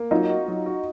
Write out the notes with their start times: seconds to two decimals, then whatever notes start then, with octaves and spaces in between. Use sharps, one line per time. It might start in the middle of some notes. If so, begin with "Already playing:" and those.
Already playing: A#3
0.11 F#3 D#4 F4
0.29 F#4
0.48 F#3
0.66 F#4